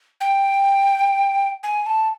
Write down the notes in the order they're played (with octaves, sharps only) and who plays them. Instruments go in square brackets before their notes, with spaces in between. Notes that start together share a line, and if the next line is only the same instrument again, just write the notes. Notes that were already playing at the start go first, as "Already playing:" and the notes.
[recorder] G5
G#5
A5